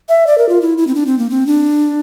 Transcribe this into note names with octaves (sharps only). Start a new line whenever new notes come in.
E5
D5
A#4
F4
E4
E4
C4
D4
C4
A#3
C4
D4